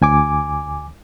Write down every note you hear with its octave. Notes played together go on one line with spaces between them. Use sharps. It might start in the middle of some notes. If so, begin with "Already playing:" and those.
D2 G#5 D6